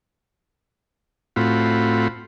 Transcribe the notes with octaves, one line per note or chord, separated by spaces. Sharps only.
A2 C4 F4 F#4 B5